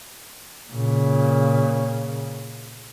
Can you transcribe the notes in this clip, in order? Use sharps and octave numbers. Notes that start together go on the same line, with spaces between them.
A#2 C#3